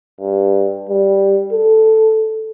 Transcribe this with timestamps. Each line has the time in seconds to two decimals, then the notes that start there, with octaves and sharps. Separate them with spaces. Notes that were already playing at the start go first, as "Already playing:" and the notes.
0.21 G2
0.89 G3
1.53 A4